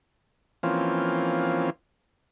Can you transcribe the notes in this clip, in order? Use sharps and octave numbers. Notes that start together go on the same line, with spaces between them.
E3 F3 A#3 C4 C#4 F4